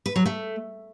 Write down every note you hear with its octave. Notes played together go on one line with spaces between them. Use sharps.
B4
F#3
A3